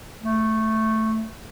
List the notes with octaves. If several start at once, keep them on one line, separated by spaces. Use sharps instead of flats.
A3